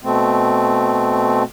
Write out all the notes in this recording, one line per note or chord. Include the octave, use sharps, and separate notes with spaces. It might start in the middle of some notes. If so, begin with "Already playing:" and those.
B2 A3 C4